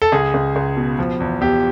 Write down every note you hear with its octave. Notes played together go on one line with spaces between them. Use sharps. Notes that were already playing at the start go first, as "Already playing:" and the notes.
A4
C#2 G#4
C#2
C#2
B2
F3
E2
E2 G4